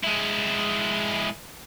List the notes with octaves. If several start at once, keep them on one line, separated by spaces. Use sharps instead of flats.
G#3 E4